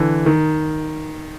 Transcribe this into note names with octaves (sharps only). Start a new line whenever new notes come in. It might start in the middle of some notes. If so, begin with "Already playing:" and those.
Already playing: D3 E3
D#3